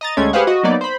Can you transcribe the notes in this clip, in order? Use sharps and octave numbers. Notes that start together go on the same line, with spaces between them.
D#5 A#5 A6
D2 G#3 A3 C#4 G#6
G4 G#4 B4 C5 F5 F#5
F#4 D#5
F#3 A#3 B3 D#4 D5
C5 B5